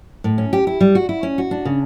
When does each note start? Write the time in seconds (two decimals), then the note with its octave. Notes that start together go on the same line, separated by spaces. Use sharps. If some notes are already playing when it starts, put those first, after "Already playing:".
0.24 A2
0.38 C#4
0.53 G4
0.67 E4
0.81 G3
0.95 F#4
1.09 E4
1.23 C#4
1.38 F#4
1.51 D4
1.65 C#3